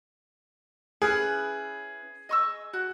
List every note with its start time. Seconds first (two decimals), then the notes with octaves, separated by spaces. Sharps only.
1.02 C#4 E4 G#4 B4
2.29 D#5 C#6 E6
2.73 F#4